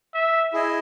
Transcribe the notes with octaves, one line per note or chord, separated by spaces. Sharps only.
E5
E4 G#4 D#5 G#5